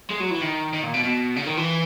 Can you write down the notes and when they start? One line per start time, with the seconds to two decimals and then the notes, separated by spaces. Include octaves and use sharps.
0.11 G#3
0.20 F#3
0.31 E3
0.41 D#3
0.73 D#3
0.83 A#2
0.94 B2
1.04 B2
1.36 C#3
1.46 D#3
1.57 E3